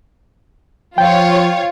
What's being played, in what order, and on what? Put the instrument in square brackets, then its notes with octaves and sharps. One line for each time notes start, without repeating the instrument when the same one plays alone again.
[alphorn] F3 [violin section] F4 C#5 [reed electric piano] G5